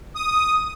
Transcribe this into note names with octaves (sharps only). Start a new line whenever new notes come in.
D#6